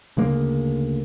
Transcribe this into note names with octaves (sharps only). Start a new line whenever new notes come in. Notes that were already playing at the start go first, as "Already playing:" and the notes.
D2 C#3 G#3 A#3